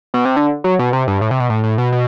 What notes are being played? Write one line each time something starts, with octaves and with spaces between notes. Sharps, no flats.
B2
C3
D3
F#3
B2
C3
G2
A2
C3
B2
A2
A2
B2
B2